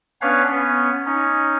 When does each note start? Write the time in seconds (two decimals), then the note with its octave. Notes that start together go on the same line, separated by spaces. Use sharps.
0.22 B3 C#4 D4 B4 C#5 F5
0.51 B3 C#4
1.06 C#4 D#4